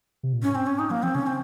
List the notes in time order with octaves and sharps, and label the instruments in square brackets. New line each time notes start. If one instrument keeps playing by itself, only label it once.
[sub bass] C3
A#2
[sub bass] G#2 [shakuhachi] C#4
[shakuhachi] C4
C#4
D#4
[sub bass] F#3 [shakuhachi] A#3
[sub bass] F3 [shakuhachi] C4
[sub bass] C#3 [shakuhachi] C#4
[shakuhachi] C4